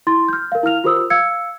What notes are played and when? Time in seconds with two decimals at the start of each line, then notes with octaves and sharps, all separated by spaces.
0.07 E4 C6 A6
0.28 F6 G6
0.52 A#4 F5
0.63 E4 F5 F6 F7
0.84 F4 G4 A#4 C5 D#6 E6
1.10 F5 E6 G#6 C#7